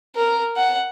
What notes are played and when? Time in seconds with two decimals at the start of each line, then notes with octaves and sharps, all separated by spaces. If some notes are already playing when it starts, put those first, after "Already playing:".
0.16 A#4
0.57 F#5